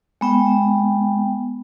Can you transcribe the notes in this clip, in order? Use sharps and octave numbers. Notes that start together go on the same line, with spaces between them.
G#3 B3 G5